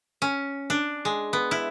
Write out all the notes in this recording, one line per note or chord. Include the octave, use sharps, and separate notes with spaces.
C#4
D4
G#3
B3
E4